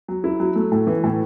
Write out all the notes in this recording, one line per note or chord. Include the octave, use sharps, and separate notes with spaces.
F#3
E4
F#3
A3
A2
E3
A2